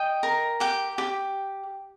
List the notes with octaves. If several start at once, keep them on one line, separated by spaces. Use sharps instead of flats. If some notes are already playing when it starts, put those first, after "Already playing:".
Already playing: D#5 G5
A#4
G4 G5
G4